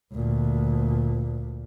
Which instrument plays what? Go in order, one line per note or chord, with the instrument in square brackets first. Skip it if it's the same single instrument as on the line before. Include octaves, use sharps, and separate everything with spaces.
[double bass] D2 A#2